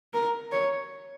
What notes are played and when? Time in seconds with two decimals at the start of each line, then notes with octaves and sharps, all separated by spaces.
0.14 A#4
0.52 C#5